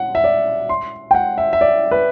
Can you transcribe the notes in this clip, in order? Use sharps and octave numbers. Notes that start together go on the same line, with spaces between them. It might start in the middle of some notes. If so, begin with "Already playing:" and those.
Already playing: F#5
E5
D5
C6
G5
F#5
E5
E5
D5
B4